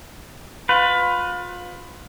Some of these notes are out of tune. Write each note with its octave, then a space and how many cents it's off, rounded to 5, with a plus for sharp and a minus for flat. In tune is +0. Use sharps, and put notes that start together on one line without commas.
F4 +30 B4 +15